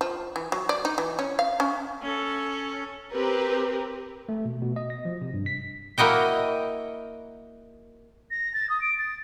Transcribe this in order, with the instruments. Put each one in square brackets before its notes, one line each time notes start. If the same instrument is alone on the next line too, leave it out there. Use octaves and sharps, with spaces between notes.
[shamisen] F3
E3
F#3
D5
D#4
E3
C#4
F5
C#4
[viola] C#4 A4
[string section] C4 G4 A#4 B4
[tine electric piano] A3
B2
B2
D#5
A#6
F3
C3
G2
B6
[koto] A#3 E4 F#4 D#5 G5
[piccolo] A#6
A6
D#6
D7
A6